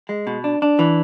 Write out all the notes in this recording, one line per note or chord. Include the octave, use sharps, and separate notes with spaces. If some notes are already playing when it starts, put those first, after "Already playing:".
G#3
B2
D4
D4
E3